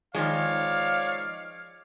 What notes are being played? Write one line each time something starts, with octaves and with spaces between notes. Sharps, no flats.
D#3 F3 G#3 C#5 D5 F5